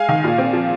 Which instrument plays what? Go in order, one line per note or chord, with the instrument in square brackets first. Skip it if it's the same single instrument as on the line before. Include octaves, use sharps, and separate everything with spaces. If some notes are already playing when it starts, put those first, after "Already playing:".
Already playing: [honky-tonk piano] G#3 F5 G#5
D#3
A#2
C4
F3